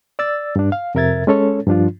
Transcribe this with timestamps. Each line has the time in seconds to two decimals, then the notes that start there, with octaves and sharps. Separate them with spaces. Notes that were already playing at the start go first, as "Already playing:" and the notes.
0.19 D5 E6 A6
0.56 G2 D4
0.72 F5
0.95 F2 C3 A#4 E5 G#6 A6
1.27 G#3 C#4 A4 C#5
1.67 G2 F3 D4 F4